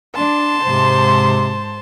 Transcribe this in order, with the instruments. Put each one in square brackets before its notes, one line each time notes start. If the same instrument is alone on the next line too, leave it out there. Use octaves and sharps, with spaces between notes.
[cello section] D4 [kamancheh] A5 C6
[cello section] G#2 C5 [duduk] C3